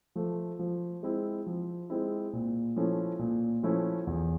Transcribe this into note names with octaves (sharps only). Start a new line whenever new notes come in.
F3 A3
F3
G#3 C4 E4
F3
G#3 C4 E4
A#2
F3 A3 C#4 E4
A#2
F3 A3 C#4 E4
E2